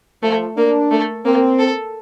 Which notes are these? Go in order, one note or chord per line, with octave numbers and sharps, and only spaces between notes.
F3 A3
A#3 D4
A3
A#3 C4
A4